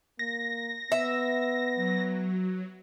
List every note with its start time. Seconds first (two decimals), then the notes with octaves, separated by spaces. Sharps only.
0.19 A#3 A#6
0.92 B3 E5
1.75 F#3